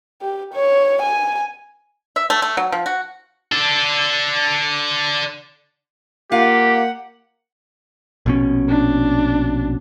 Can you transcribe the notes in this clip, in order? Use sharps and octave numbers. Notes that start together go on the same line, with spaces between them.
G4
C#5
G#5
E5
A3
A3
F#3
F3
F#4
D4 A4
A#3 F4 G4 F#5
A#1 B2 C#4
D4